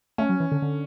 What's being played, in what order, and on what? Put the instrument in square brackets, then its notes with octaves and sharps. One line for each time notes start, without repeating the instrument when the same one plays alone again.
[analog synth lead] A3 [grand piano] C#4
[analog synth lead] F#3
E3
D3
D3